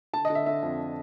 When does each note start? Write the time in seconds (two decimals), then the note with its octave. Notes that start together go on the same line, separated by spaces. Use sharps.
0.13 D3 A5
0.25 D#5
0.30 D3
0.35 E5
0.46 D3 E5
0.63 F2